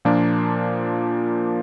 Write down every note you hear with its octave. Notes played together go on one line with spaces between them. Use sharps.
A#2 F3 A#3 D4